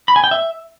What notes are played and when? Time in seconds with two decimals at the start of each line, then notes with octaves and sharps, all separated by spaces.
0.08 B5
0.16 G#5
0.24 G5
0.31 E5